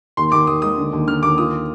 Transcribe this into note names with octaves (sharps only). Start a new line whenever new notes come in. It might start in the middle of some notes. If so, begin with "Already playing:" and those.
D#2 C6
D#2 D6
D#2 D#6
G#3 D#6
D3
D#2
D3 F6
D#2 D6
F4 D#6